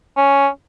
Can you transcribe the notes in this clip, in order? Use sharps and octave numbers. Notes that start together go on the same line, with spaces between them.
C#4